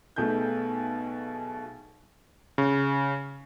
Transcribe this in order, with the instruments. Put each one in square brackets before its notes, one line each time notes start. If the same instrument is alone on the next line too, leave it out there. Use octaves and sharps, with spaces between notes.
[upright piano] B1 B2 A3 G#4 G6
[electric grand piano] C#3